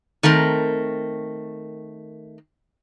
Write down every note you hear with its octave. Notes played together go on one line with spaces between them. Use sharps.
D#3 A3 C4 A#4